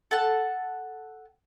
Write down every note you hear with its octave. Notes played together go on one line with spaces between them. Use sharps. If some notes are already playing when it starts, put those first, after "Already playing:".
A4 F#5 A5